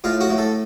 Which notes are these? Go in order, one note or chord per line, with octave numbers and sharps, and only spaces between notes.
A2 F4
F#4
A2
A4